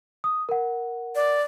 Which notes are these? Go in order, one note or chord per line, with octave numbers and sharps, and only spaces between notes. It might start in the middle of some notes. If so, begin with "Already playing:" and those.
D#6
A#4 F#5
D5